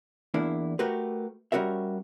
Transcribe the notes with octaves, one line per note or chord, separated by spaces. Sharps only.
E2 A#3 D4 E4
A3 F#4 G4 A#4 B4
G3 C#4 F#4 A#4 E5